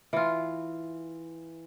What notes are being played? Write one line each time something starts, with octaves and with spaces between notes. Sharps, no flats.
E3 F4